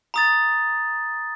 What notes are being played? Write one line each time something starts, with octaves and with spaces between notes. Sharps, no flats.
A#5 D#6 A6